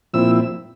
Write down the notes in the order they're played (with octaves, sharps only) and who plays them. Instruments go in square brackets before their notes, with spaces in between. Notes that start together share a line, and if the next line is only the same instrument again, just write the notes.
[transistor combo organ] A#2 F3 C4 E4 E6